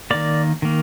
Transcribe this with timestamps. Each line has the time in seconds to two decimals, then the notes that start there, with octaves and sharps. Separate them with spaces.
0.11 D#3 A#3 D5
0.62 D#3 A#3